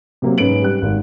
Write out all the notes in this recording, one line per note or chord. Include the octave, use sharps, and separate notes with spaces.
C3 F#3 A#3 C4
G#2 C#4 B4 D7 F#7
G3 F#6
G#1